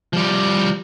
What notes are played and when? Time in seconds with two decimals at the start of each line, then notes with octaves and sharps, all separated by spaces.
0.13 F3 G3